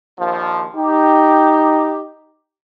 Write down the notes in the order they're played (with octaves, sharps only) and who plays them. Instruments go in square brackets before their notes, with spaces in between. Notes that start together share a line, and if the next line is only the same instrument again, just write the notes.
[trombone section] A#1 D#2 F3
[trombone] D#4 [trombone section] G4